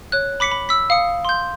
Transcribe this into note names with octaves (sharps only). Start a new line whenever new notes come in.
C#5 F#6
B5 D6 B6 C#7
B5
E6 B6
F5 D#6 C#7
C6 G6